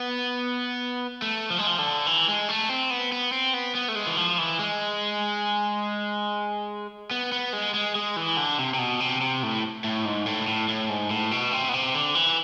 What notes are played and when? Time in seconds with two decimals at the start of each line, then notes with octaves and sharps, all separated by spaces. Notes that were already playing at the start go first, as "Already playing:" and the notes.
Already playing: B3
1.22 A3
1.50 F3
1.58 G#3
1.67 F3
1.79 D3
2.06 E3
2.28 G#3
2.49 A3
2.69 C4
2.90 B3
3.12 B3
3.32 C4
3.54 B3
3.75 B3
3.88 A3
3.95 G#3
4.07 E3
4.17 F3
4.38 E3
4.59 G#3
7.11 B3
7.32 B3
7.53 G#3
7.74 G#3
7.95 G#3
8.16 E3
8.37 D3
8.59 C3
8.74 C3
8.79 B2
9.00 C3
9.21 C3
9.43 A2
9.84 A2
10.05 G#2
10.26 A2
10.48 A2
10.68 A2
10.89 G#2
11.11 A2
11.31 B2
11.53 C3
11.69 B2
11.74 C3
11.95 D3
12.15 E3